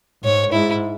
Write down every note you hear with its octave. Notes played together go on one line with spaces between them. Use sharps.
G#2 C#5
G#2 E4